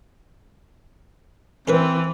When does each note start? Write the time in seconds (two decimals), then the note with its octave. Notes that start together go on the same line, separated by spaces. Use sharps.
1.68 E3 C4 C#4 A#4 B4